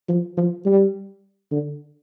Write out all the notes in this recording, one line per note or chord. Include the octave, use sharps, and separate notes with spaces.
F3
F3
G3
D3